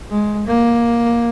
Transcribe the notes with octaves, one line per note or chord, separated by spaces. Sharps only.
G#3
A#3